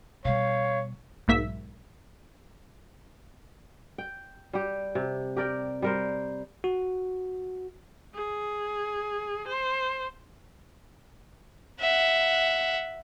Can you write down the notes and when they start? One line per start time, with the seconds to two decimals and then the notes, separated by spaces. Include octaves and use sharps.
0.25 B2 G3 C#5 F5
1.28 B1 G#2 A#3 E5 B6
3.98 G5
4.53 G3 G4
4.95 C3
5.37 G4 A#4 D5 G5
5.82 G3 A#4 C5
6.64 F#4
8.15 G#4
9.47 C5
11.81 E5 F#5